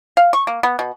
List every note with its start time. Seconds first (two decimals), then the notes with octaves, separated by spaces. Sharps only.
0.17 F5
0.33 C#6
0.47 A#3
0.63 B3
0.79 B2